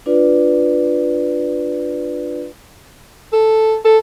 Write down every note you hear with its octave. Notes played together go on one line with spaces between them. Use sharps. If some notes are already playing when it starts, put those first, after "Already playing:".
D4 F4 B4 D5
A4
A4